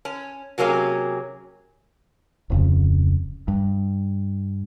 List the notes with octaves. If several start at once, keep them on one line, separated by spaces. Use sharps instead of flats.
C#4
C3 F#3 A#3 C#4 G#4
D1 F2 C#3
G2